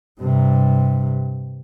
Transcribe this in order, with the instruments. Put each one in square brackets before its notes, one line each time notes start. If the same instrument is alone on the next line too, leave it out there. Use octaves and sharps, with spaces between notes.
[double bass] G2 C3